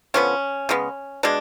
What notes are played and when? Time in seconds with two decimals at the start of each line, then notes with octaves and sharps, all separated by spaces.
0.14 D3 F3 B3 C#4
0.69 C#3 G#3 B3
1.23 B2 G#3 D4